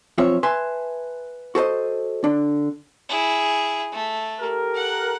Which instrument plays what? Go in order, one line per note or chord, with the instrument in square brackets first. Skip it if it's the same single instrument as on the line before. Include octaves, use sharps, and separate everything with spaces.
[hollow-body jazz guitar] B1 F3 C4 F4 C#5 E5
B4 E5 G#5 A5 C6
F#4 A4 C5 D#5
D3 D4
[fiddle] E4 G#4
A3
[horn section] G4 A4 A#4
[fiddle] F#5 F#6